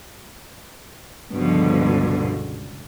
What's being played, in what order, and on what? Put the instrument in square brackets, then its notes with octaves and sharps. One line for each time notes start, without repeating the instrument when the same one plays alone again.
[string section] C#2 G2 B2 D3 F3